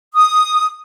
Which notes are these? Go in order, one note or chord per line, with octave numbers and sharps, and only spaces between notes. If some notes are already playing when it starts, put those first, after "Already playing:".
D#6